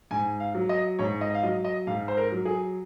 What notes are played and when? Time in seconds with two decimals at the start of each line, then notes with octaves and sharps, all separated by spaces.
0.11 G#2 G#5
0.40 F5
0.55 F#3
0.69 D#5
0.99 G#2 C#5
1.21 D#5
1.35 F5
1.43 F#3 D#5
1.65 D#5
1.87 G#2 F5
2.08 C5
2.17 A#4
2.32 F#3
2.45 G#4